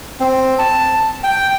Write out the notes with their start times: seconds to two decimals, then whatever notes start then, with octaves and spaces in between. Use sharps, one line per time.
0.20 C4
0.59 A5
1.23 G5